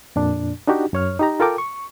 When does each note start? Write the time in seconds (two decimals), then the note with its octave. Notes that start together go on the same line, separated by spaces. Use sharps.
0.16 F2 A#2 D4
0.68 D4 D#4 F#4 G4
0.93 F#2 C#5 F6
1.20 D#4 G4 A#5
1.40 F4 A4 A#4 G5 D6
1.58 C#6